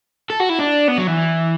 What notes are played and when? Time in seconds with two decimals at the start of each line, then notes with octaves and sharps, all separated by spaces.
0.30 A4
0.40 F#4
0.50 E4
0.59 D4
0.88 B3
0.98 F#3
1.07 E3